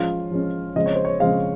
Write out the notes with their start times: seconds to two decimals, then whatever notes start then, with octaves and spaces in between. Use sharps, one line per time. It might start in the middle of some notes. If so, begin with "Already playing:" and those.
Already playing: F3 G#3 C#4 F4
0.31 F3 G#3 C#4
0.75 C#3 F3 G#3 C4 D#5
0.86 C#5
0.95 C5
1.05 C#5
1.20 C#3 F3 G#3 C4 F5